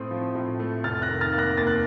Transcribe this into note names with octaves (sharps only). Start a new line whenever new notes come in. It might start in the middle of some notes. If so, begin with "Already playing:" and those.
Already playing: A2 A3 C4 C6 D#6
F3
A2
A3
F1 F6 A6
F#6 A#6
D#3
F6 A6
A#3
F#6 A#6
D#2 A6
F#6